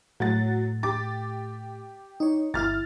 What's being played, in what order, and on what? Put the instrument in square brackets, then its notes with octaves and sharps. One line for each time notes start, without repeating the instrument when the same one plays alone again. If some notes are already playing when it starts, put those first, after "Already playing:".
[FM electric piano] A2 [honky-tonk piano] F#3 F#5 A6
[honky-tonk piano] G4 D6 A6
[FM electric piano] D#4 C#5
[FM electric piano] G1 E4 [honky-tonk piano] F6 A6